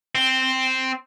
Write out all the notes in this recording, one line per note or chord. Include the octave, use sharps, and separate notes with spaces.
C4